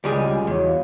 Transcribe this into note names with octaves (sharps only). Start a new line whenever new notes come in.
C#2 G3 F4 G#4 D#5
E2 B3 F#4 C#5
F5